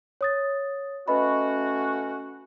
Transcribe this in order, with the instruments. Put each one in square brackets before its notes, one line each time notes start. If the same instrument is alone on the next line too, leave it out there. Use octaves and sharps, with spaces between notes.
[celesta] C#5 D#6 A6
[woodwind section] A3 C#4 F#4 [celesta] B4 D#5 B5